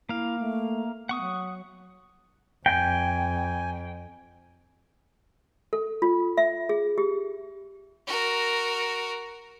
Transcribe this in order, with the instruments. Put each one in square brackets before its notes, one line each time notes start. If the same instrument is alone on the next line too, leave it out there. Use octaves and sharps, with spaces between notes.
[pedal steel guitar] A#3 F5 [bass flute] E4
[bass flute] A3
[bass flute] B3 [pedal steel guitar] F#5 C#6 D#6
[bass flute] F#3
[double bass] F2 [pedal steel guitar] G5 [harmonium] G#5
[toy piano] A4
F4
E5
G#4
G4
[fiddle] F#4 A#4